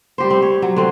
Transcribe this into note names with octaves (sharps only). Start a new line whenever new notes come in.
G3 G4 C5
C4
C#5
F#3
D3 C4